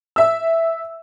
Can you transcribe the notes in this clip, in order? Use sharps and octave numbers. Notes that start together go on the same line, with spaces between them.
E5 E6